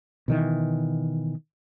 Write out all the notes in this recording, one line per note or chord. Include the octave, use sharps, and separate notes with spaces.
B2 D#3 E3